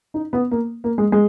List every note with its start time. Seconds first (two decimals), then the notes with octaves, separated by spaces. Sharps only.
0.14 D#4
0.33 B3
0.51 A#3
0.84 A#3
0.98 G#3
1.12 G#3